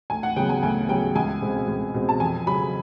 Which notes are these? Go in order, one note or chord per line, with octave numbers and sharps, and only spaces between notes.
D2 G#5
F#5
C#3 F#3 B3 G5
G#5
D2 G#5
C#3 F#3 B3 G5
C#2 G#5
B2 G#3 C4
C#2
B2 G#3 C4
A5
F2 G#5
C#3 F#3 B5